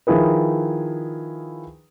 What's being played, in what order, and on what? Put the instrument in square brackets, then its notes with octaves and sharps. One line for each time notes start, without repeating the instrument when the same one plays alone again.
[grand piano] D#3 F3 E4 G#4 B4